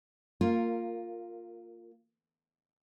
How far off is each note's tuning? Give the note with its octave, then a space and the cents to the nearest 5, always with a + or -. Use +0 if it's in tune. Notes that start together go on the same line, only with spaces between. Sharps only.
A#3 -20 F4 +5 A#4 +0